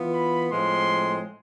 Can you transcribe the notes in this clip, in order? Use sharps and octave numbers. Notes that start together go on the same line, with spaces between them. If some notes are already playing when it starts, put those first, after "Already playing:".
Already playing: E3 B3 F4
B5
A2 F3 G#3 C4 C6